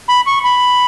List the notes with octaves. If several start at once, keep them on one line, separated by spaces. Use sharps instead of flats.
B5
C#6
B5